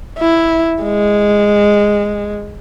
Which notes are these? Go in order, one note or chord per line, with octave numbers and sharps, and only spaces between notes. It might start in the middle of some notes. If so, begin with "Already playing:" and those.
E4
G#3